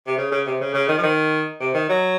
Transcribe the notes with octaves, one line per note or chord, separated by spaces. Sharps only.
C3
C#3
C#3
C3
C#3
C#3
D#3
F3
D#3
C3
D#3
F#3